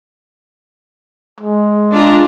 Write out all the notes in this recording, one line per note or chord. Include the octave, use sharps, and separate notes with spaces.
G#3
D4 F4 A#5